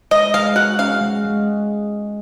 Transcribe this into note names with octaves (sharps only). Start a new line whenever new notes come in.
G#3 D#5
G#3 F5
F#4 F#5
C#4 F5
G#3
G#3